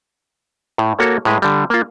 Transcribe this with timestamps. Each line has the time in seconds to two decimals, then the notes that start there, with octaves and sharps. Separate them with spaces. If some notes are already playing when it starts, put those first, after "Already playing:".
0.78 A2
0.99 A#3 F#4 A4 C#5
1.25 A2 G#3 B4
1.42 D3 G3
1.70 A#3 F4